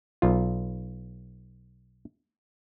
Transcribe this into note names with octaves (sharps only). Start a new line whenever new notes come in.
B1 F4